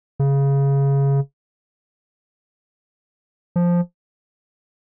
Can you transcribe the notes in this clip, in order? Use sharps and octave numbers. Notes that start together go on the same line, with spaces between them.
C#3
F3